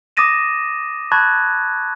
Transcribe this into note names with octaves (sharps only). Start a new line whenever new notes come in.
D6 D#6 A6 A#6 D#7 E7
A5 B5 C#6 F#6 G#6 A6